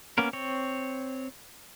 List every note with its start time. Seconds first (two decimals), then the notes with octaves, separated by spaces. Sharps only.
0.18 A#3 B3 C#4 A#4
0.33 C4 C#5